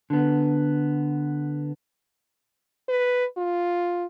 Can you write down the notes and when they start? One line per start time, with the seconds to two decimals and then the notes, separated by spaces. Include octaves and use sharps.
0.10 D3 B3
2.88 B4
3.37 F4